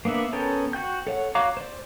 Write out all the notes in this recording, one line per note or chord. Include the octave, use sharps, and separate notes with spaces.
A#3 B3 D4 E5
B3 C#4 A4 A#4 G5
F#4 G5 G6
A4 C#5 F#5
F#4 C#5 F5 A#5 D6
C5 D5